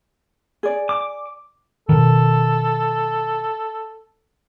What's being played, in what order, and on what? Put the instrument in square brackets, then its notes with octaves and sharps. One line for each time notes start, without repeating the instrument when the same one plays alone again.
[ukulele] G#4 D5
[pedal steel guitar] D6
[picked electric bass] B2 D#3 [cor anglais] A4